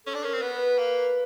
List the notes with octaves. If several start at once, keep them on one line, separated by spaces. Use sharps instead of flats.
C#4 A4
D4
C#4 A#4
C4
B3 B4
A#3